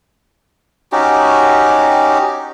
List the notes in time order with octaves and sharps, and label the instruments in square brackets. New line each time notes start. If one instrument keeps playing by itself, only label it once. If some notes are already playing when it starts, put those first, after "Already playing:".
[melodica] C#4 D#4 F#4 G4